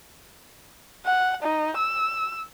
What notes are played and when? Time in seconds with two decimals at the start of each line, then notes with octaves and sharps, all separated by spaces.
1.06 F#5
1.43 D#4
1.77 E6